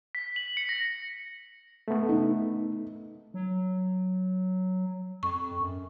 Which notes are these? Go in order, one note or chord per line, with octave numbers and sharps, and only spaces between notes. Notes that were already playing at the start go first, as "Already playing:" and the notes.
B6
F#7
C#7
A#6
A3 B3
D#4
F#3
F2 C#6
F#2